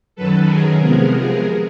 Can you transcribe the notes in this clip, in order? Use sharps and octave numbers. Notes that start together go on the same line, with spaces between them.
F#2 D#3 F#3 A4 B4
G#4 A#4
C3 F3 G#3 B3